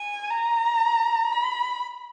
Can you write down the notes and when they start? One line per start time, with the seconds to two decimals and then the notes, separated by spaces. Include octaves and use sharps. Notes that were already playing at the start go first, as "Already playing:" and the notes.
Already playing: G#5
0.30 A#5
1.33 B5